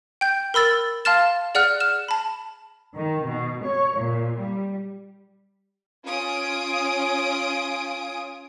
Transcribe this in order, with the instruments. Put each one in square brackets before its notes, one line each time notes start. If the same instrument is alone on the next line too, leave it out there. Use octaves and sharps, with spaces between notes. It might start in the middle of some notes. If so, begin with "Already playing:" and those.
[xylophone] G5 G6
A#4 B5 E6 A6
F5 A5 C6 F6 A6 E7
G#4 D5 F#5 F6 F#6
F6 E7
A5 B5
[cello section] D#3
B2
C#5
A#2
G3
[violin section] C#4 F4 G#5 D#6 D7